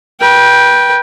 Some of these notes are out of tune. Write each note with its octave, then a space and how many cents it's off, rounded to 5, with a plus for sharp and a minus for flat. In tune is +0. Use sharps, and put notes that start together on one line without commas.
B4 -30 G5 +0